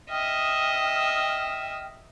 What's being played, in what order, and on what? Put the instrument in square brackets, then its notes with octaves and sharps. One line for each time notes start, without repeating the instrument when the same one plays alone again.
[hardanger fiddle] D#5 E5 [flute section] G5 D#6 F6